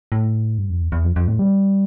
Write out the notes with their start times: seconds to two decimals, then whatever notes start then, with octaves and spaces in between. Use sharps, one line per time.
0.12 A2
0.58 G2
0.70 F2
0.81 E2
0.92 E2
1.04 F2
1.16 F2
1.27 A2
1.39 G3